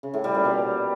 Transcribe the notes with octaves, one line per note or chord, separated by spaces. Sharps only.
C#3
A2
G3
A#2
B2